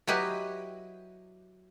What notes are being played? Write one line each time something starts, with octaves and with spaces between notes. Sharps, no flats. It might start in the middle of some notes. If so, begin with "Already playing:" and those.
F#3 E4 G4 B4 D#5